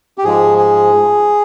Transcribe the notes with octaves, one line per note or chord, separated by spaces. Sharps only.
G4
G#2 F3 G#3 G#4
G#4